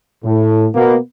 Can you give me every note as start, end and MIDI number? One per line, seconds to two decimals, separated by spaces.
0.24 0.67 45
0.75 0.96 47
0.75 0.96 58
0.75 0.96 59